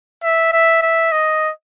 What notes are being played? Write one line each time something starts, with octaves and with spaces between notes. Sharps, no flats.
E5
E5
E5
D#5